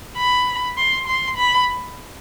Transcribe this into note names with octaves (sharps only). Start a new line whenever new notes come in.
B5
C6
C6
B5